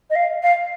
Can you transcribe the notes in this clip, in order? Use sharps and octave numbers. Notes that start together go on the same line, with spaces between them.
D#5
F5
F5